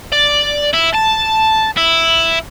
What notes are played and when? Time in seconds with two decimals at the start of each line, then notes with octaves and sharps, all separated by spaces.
0.12 D5
0.74 E4
0.95 A5
1.77 E4